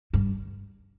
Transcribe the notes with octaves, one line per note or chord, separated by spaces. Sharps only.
G2